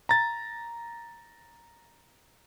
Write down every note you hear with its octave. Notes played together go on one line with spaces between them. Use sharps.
A#5 A6